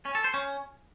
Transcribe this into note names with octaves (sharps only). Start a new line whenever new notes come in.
C#4
A4
C5
C#4